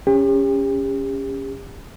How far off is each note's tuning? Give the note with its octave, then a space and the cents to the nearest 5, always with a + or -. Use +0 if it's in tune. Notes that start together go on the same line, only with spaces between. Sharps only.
C#4 +0 G4 +40